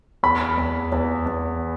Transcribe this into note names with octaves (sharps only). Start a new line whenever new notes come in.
E2 B5
E2
E2
E2